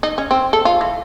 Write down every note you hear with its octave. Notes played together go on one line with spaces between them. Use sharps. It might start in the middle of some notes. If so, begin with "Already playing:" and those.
D#4
C#4
C4
A4
F4
E3